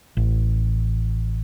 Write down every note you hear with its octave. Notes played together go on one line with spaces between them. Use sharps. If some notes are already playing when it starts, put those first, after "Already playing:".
A1